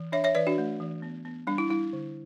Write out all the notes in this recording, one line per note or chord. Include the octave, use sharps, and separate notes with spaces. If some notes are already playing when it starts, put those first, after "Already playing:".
Already playing: E3
D4 C#5 E5
C#5 E5
E3 B4 D5
D4 F#4
A3
E3
B3
B3
G3 D4
E4
G3 E4
D3